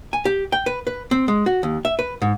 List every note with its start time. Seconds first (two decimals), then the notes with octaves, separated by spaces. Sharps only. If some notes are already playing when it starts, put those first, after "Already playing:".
0.13 G#5
0.25 G4
0.52 G5
0.66 B4
0.87 B4
1.11 C4
1.28 G#3
1.46 F#4
1.63 D#2
1.85 E5
1.99 B4
2.22 G#2